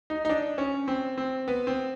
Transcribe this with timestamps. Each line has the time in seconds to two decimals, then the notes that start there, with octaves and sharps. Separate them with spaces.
0.10 D#4
0.25 D#4
0.29 D4
0.58 C#4
0.88 C4
1.18 C4
1.48 B3
1.67 C4